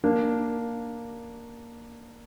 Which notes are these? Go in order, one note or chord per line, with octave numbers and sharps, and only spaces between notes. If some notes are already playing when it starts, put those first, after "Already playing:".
A#3 D4